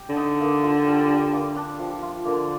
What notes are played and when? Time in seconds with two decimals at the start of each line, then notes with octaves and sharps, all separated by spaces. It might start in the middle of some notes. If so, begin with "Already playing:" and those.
Already playing: G4
0.10 D3
0.17 D#4
0.40 A#3
0.63 F4
0.86 G3
1.10 G3
1.33 A#3
1.56 D4
1.79 F3
2.02 F4
2.25 D3 A#3